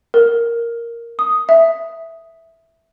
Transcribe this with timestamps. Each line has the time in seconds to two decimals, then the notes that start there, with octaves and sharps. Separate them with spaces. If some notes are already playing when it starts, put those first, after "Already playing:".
0.14 A#4
1.19 D#6
1.49 E5